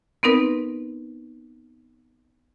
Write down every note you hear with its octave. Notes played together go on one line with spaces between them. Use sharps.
B3 C4 D#4 A#4 B4